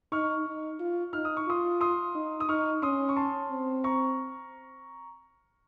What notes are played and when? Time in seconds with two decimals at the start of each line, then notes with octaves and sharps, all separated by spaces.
0.12 D#4 C#6 F6
0.47 D#4
0.80 F4
1.13 D#4 F6
1.25 D#6
1.37 C#6
1.48 F4 C6 D#6
1.81 C6 D#6
2.15 D#4
2.40 D#6
2.49 D#4 C#6 F6
2.82 C#4 C6 D#6
3.09 C#6
3.17 A5 C6
3.51 C4
3.84 A#5 C#6